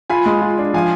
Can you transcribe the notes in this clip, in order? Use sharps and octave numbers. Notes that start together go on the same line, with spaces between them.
F4 G#5 B5
G#3
F4
D4
F3 F5 G#5